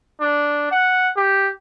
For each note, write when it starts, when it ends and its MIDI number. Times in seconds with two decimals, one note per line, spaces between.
0.21 0.69 62
0.71 1.11 78
1.16 1.51 67